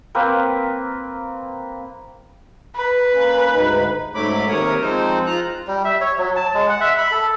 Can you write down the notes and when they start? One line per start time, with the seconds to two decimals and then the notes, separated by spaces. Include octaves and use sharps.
0.15 A#3 C4 B4
2.76 B4
3.13 A#3 C#4
3.52 D2 G#2 D#4
4.15 G#2 F#3 A3 C#4 B5 D6
4.48 D#2 C3 A#4 C#5 D#6
4.81 F3 G#3 C4 D#4 C5
5.26 F4 A#5 F#6
5.67 G3
5.85 E5
6.01 C#5
6.18 F#3
6.36 A5
6.54 G#3
6.69 F#5
6.81 E5
6.98 B5
7.11 A4